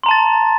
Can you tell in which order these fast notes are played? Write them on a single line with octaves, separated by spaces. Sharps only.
C6 A#5 A5 A6